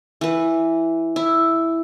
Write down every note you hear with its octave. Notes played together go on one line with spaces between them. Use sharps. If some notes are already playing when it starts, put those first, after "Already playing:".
E3 B4
E4